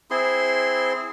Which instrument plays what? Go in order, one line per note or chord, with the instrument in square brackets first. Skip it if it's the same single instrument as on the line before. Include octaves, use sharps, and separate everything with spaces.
[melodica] C4 E4 G#4 C6